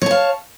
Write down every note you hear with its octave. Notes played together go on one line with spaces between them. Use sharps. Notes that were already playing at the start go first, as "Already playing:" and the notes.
C#5 F5 A5